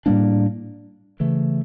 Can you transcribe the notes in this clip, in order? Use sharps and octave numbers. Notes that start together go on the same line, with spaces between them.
A2 G3 A#3 D4
C#3 E3 A3